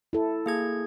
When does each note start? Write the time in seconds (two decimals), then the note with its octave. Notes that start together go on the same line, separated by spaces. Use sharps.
0.13 E4 A4
0.46 A#3 G#4 G#6